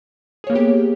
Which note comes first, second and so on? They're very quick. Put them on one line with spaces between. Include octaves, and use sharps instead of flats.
G#4 C#5 A#3 B3 G4